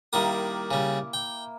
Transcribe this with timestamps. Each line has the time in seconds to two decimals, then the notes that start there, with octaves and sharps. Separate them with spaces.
0.13 D#3 G3 A#3 E4 D#6
0.71 C#3 G3
1.14 G5